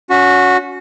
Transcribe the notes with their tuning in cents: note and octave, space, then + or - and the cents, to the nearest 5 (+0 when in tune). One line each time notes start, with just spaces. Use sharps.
C#4 +25 F#4 -15